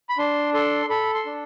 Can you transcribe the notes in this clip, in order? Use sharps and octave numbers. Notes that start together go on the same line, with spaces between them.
B5
D4 C6
A4 C6
A4 B5
C6
D4